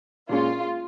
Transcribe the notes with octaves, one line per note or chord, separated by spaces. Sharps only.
A#2 G#3 C#4 F4